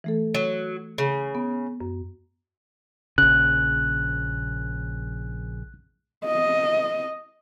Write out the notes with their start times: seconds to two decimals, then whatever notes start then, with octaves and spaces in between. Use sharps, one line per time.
0.04 E3 A3 A4
0.35 F#3
0.98 C#3
1.35 B3
1.81 F#2
3.18 A#1 C#3 F#6
6.25 D#5